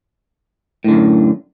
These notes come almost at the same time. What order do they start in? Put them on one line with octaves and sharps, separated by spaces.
A2 D3 F#2